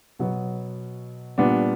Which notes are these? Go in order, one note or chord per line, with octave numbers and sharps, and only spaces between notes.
B2 F#3 B3
A#2 G3 B3 D4